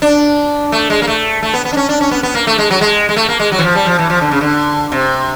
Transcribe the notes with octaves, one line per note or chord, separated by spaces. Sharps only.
D4
A3
G#3
A#3
A3
A3
B3
B3
D4
C#4
D4
C#4
B3
B3
A#3
A3
G#3
F#3
G#3
G#3
A3
A#3
G#3
F#3
E3
F3
G3
F3
E3
F3
D3
C#3
D3
C3